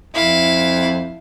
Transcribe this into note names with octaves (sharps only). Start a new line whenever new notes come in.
F2 E4 F5